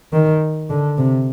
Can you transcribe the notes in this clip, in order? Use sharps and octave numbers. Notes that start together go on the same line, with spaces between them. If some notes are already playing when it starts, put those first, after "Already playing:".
D#3
D3
C3